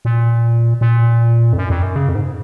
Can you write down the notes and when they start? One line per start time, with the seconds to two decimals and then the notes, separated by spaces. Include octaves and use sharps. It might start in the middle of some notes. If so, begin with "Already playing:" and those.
0.05 A#2
0.81 A#2
1.53 F2
1.58 F#2
1.70 F2
1.83 F#2
1.96 C#3
2.09 F2
2.15 G#2